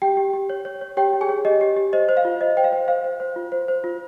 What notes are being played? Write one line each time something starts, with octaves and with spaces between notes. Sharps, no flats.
G4 G5
G4
G4
C#5
C#5
C#5
G4 C#5 G5
G4
G#4 G#5
C#5
G4 D#5
G4
G4
C5 D#5
C5
F5
F4
C5 D#5
C5 G5
F5
C5
C5 F5
C5
C5
F4
C5
C5
F4